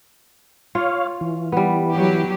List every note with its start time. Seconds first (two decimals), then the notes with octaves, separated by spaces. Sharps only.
0.75 F4 C#5 F5
1.21 E3
1.52 G3 B3
1.94 F#3 G4